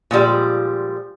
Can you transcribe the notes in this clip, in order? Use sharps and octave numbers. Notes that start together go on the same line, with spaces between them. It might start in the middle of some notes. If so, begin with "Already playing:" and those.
A#2 F3 G3 G#3